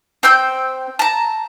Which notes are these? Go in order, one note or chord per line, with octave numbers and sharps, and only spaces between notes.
C4 G5 E6 G6
A5 A#5